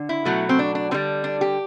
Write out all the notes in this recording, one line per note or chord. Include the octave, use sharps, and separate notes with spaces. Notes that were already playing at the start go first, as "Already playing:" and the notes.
Already playing: D3
E4
B2 F#3 A3
C4
D4
D4
D3 G3 C4
D4
G4